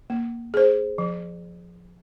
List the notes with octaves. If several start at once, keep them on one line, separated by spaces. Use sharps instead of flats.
A#3
G#4 C5
F3